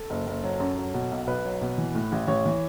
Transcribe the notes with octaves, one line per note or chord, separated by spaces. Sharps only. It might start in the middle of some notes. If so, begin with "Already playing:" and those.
Already playing: A4
F#1
F#1
F#3
F#2
F#3
B2
B1
B1 B4
F#3
B2
E3
A2
A1
A1 C#5
E3